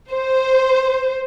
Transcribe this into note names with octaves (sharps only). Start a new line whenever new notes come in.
C5